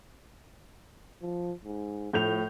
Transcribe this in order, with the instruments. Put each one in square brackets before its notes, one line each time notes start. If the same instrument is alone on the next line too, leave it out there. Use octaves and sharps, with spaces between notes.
[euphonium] F3
G#2
[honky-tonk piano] A2 G6 F7 [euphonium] F3